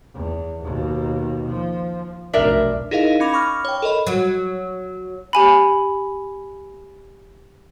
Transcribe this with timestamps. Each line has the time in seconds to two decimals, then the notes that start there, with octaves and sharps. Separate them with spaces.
0.14 E2
0.63 D#2 B2
1.49 F3
2.33 F1 B1 D4 A#4 E5
2.91 D#4 E4 G#4 A#4 D#5 F5
3.20 C#4 B5 D6 A#6 F7
3.33 B5 C#6 D6 F6
3.65 C#5 G5
3.82 A4 A#4 D#5 B5
4.07 F#3
5.33 G4 G#5 B5